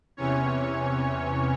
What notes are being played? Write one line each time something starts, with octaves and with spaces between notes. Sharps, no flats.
E2 C3 E3 C#4 C#5